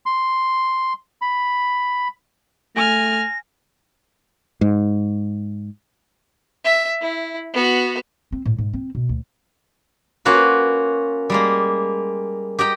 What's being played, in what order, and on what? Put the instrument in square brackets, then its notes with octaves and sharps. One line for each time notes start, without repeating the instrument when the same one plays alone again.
[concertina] C6
B5
[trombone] A3 [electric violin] G#5 F6 [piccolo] A#6
[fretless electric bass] G#2
[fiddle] E5
E4
B3 F#4
[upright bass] C4
A2
G#2
C4
B2
D2
[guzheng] A#3 C#4 F4 F#4 B4
G3 G#3 A#3
G4 D#5 G5 A#5